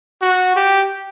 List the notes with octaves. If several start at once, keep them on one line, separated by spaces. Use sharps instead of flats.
F#4
G4